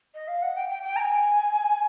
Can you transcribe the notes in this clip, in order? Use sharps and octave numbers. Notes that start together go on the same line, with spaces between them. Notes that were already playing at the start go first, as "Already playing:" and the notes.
D#5
F5
F#5
G5
G5
G5
A#5
G#5